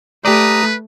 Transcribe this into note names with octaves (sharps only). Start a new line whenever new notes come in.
A3 G4 B4 D5 A#5 D#6